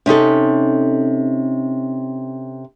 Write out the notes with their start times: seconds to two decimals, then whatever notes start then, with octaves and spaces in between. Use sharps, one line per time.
0.06 C3 C#4 D#4 A4